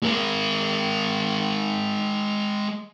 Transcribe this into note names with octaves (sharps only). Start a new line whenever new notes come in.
G#3 A#4